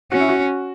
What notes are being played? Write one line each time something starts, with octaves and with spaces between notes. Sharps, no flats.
C#4 F#4
E4
F#4